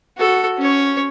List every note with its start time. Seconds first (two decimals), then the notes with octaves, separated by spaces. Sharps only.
0.17 F#4 A4
0.58 C#4 C#5